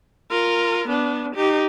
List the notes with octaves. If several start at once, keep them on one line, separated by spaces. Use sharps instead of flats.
F4 A#4
B3 D4
D#4 G4